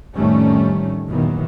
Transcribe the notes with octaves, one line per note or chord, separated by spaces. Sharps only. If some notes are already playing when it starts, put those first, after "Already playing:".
A1 F2 D#3 G3 A3 C#4
F#1 D#2 A#2 D#3 E3 B3